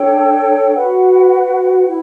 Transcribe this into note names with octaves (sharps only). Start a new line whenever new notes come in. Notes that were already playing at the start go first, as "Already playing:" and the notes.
Already playing: D4 A4 C#5 G5
F#4 B4 F#5
E4